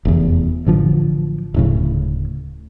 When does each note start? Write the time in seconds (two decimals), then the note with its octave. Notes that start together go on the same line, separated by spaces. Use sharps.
0.05 F1 E2
0.66 A1 D3 F3
1.54 D1 A2 C#3